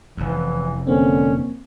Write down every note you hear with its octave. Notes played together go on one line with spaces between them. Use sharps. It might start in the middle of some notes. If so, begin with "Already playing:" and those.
F1 E2 E3
D3 A#3 C4 C#4